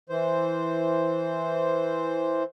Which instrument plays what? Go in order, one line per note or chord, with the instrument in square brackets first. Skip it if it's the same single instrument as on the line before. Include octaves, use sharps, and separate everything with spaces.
[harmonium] E3 C5